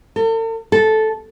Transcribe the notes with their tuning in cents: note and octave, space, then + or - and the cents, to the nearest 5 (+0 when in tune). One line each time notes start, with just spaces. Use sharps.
A4 +45
A4 -10